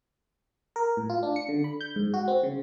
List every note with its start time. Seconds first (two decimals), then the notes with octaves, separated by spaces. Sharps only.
0.76 A#4
0.97 A2
1.10 F4
1.23 D4
1.36 C#7
1.49 D3
1.64 B5
1.81 G6
1.96 G#2
2.14 F#4
2.28 C4
2.43 C#3